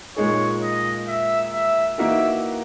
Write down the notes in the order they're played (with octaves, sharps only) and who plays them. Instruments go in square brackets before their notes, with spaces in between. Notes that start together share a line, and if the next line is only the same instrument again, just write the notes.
[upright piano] A#2 G#3 D#4 G#4 [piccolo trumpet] C#5
[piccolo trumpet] D#5
E5
E5
[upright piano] E3 A#3 D#4 F#4 A#4 [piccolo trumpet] E5